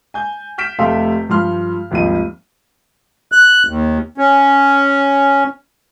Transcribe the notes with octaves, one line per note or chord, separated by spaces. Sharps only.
G#5 G6
F6 G6 B6 D7 E7
F1 A3 G4 F5 C6 E6
G2 F3 C6 F6
G#1 D#2 F3 G3 D#4 D#7
F#6
D#2
C#4